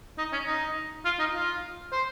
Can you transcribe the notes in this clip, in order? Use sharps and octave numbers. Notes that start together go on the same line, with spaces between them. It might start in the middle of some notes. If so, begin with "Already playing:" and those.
D#4
C#4
D#4
F4
D#4
F4
C5